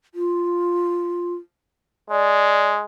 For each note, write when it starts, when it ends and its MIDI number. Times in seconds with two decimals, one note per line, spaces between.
0.15 1.34 65
2.10 2.85 56
2.10 2.68 74